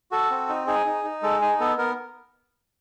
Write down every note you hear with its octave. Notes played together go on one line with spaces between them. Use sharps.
F#4 A4
C4
D#4
D#4 G#4
D#4
D#4
G#3 A4
D#4 G#4
B3 A4
B3 A#4